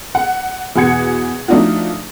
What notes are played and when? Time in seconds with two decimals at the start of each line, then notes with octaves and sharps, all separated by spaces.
0.15 F#5
0.76 E2 B2 F#5 G#6 C#7
1.48 F3 A3 D4 D#4 F4 F#4